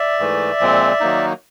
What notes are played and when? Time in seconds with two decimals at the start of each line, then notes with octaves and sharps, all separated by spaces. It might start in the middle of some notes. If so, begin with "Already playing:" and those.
Already playing: D5 E5
0.19 G#2 E3 A3
0.60 A#2 F3 G#3 C4
1.00 D#3 F#3 A#3 D#4